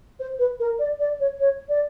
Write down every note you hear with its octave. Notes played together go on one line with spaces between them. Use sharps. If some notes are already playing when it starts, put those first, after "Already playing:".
C5
B4
A#4
D5
D5
C#5
C#5
D5